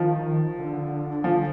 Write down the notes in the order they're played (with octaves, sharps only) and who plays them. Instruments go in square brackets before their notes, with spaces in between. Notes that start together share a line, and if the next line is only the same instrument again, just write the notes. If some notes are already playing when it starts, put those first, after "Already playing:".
Already playing: [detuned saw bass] D#3 [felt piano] F3
[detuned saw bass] D3
[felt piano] F3